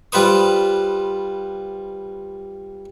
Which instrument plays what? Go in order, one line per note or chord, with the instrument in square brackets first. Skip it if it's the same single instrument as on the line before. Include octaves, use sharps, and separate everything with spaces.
[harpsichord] G3 F4 B4 C5 D#6